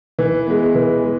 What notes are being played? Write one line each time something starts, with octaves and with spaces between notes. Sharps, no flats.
E3
G#3 B3
E3
G#3